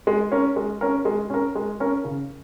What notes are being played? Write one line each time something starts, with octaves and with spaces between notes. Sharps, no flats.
G#3
C#4 A#4
G#3
C#4 A#4
G#3
C#4 A#4
G#3
C#4 A#4
C#3